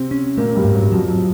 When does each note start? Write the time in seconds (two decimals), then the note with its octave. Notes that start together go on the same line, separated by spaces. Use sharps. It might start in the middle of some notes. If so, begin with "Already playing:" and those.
Already playing: C3 C4
0.11 C#4
0.37 A#2 A3 A#3
0.55 G2 G3
0.64 G#2
0.75 F#2 F#3
0.92 F2 F3 F#3